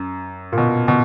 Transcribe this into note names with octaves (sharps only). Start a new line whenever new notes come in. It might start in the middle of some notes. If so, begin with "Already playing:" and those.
Already playing: F#2
A#2
B2
B2